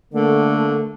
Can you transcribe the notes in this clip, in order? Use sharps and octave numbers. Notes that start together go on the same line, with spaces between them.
D3 A3 A#3